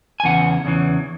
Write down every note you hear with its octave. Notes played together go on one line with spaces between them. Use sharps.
G#5
E2 C#3 E3 F#5
E2 C#3 E3